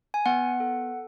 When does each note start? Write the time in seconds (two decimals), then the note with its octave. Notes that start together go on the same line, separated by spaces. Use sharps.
0.14 G#5
0.26 B3 F#5
0.60 A4